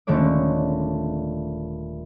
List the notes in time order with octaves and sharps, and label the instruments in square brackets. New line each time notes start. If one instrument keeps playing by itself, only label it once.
[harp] D#1 D3 G#3 A3 C#5 D6